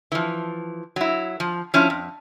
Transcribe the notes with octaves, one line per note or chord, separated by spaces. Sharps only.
E3 F3
F#3 E4
F3
F3 C#4 E4
F2